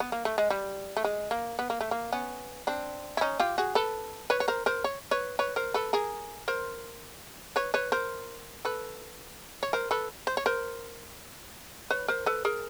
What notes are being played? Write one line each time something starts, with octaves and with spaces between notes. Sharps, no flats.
B3
A#3
A3
G#3
G3
A3
G#3
A#3
B3
A#3
A3
A#3
B3 C#4
C4 D4
E4
C#4 D#4
F4 G4
F#4 G#4
A4 B4
B4 C#5
C#5
A#4 C5
A#4 C5
C#5
B4 C#5
B4 C#5
A#4 C5
A4 B4
G#4 A#4
A#4 C5
B4 C#5
B4 C#5
A#4 C5
A4 B4
C#5
A#4 C5
A4 B4
C5
C#5
A#4 C5
B4 C#5
A#4 C5
A4 B4
G#4 A#4